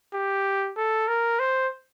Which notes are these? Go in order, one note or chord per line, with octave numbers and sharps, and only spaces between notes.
G4
A4
A#4
C5